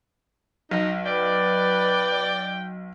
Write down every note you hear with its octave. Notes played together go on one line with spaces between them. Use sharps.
B1 D#4
B4 D5 G5